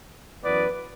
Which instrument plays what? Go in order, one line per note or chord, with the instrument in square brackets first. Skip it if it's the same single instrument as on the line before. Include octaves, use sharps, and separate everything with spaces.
[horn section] F#2 E3 B3 B4 D5